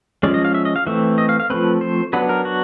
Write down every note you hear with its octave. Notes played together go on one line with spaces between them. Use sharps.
F3 G#3 C#4 D5
D#5
F5
E5
D#5
F5
E3 A3 C4 E5
D#5
F5
F5
F3 A3 C4 B4
C5
F#3 B3 D4 B4
A#4
F#4